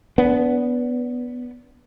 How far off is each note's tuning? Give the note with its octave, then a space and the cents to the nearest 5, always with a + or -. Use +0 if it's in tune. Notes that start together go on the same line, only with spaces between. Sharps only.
B3 +0 D4 -30